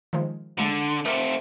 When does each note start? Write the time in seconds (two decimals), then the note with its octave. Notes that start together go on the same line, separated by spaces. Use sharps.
0.13 D#3 F3 G#3
0.59 D3 G#3 D5 A5
1.05 A3 C4 A#4 D6